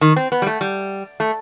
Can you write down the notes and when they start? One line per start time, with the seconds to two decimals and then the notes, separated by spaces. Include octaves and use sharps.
0.01 D#3
0.16 C4
0.32 B3
0.42 G3
0.47 A3
0.61 G3
1.20 A3